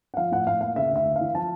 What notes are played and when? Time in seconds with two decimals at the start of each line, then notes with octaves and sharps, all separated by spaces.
0.14 F#5
0.17 F3 F5
0.32 A2 F#5
0.46 A2 F5
0.61 A#3 F5
0.76 C#3 E5
0.91 D2 E5
1.05 D2
1.16 E3 F5
1.35 F3 A5